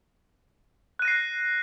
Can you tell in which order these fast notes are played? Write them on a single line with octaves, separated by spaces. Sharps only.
F#6 D#7 A#6 C7